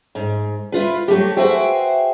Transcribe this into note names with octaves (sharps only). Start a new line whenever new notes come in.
G#2
E4 F4 B4
F#3 A3 G4
F#4 G#4 B4 C5 E5 G5